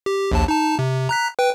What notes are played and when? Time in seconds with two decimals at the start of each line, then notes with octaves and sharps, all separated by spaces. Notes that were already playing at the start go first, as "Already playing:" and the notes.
0.06 G4
0.31 A#1 D#2 A5
0.48 D#4 A5
0.79 C3
1.09 A#5 F#6 B6
1.39 B4 G5